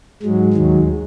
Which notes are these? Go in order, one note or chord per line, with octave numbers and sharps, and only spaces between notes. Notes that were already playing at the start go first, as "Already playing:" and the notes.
G#2 F#3 G#3
D#2 D#3 F#3